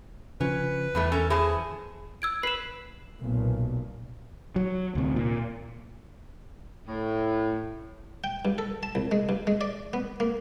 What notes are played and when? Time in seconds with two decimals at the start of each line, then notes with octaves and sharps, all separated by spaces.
0.41 C#3 F3 C#4 B4
0.95 E2 A2 G3 A3
1.12 C#4 A4 A#4
1.30 E3 G#4 C5 A5
2.22 E6 G#6 D7
2.43 B4 C7 E7
3.21 B1 A#2
4.56 F#3
4.95 D2 C3
5.16 A#2
6.88 A2
8.24 G5
8.45 G2
8.58 A4
8.83 A5
8.95 C2
9.12 G#3
9.29 G2
9.47 G#3
9.61 D5
9.93 B3
10.20 A#3